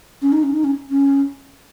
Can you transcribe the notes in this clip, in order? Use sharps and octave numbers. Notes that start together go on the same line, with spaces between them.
C#4
D#4
C#4
D#4
C#4
C#4